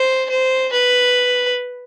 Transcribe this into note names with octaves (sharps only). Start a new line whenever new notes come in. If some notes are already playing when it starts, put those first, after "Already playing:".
Already playing: C5
C5
B4